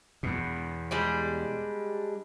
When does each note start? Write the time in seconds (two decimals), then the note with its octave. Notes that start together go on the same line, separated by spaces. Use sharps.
0.23 E2 B2
0.91 G3 G#3 D4